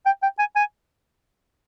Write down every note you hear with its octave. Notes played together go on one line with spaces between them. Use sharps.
G5
G5
G#5
G#5